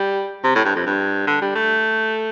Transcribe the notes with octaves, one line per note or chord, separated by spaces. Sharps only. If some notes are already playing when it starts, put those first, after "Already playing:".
Already playing: G3
C3
A2
G2
F2
G2
D3
G3
A3